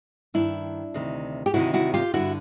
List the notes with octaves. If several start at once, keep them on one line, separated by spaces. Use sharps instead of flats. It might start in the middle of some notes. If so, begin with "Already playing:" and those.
G2 D#3 D4 E4
D2 C3 D#3
G4
D2 C3 D#3 E4 F#4
E4 F#4
F4 G4
G2 D3 E4 F#4